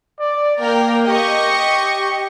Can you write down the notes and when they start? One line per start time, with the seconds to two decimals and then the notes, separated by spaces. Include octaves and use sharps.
0.20 D5
0.60 A#3 A#4 G5
1.07 G4 D#5 C#6